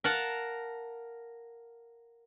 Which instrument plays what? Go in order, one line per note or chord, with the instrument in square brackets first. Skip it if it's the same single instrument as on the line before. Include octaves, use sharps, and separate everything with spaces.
[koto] A#4 F5 F#5 A5